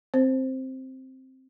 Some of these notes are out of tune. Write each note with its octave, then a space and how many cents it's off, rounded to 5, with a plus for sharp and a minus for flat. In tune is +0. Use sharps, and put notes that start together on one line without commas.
C4 +0 C5 +5